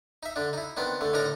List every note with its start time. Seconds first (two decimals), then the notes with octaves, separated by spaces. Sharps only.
0.23 D#4 E5
0.36 D3 D4
0.53 D#4 E4
0.77 D#3 B3 C4 D4
1.01 D3 A3
1.13 A2 D3 D4 D#4 A#4 A#5